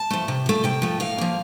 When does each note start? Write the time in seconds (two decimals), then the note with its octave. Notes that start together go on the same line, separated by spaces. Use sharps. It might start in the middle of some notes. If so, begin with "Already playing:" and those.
Already playing: A5
0.10 F3 A3
0.28 C3
0.46 F3 A3
0.64 C3 G5
0.82 F3 A3
1.00 A2 F5
1.18 F3 A#3